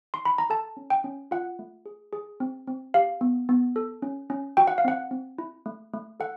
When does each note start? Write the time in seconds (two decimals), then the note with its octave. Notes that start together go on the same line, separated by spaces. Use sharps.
0.14 C6
0.25 B5
0.38 A#5
0.50 A4 A5
0.77 C#4
0.90 G5
1.04 C#4
1.31 F4 F#5
1.59 A3
1.86 G#4
2.13 G#4
2.40 C4
2.67 C4
2.94 G4 F5
3.21 B3
3.49 B3
3.76 A4
4.02 C#4
4.30 C#4
4.57 F#4 G5
4.67 F#5
4.78 F5
4.85 C4 F#5
5.11 C4
5.38 E4
5.66 A3
5.93 A3
6.20 A4 F#5